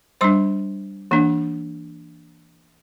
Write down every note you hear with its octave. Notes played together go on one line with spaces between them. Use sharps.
G3 D4 C5 C6
E3 A#3 D4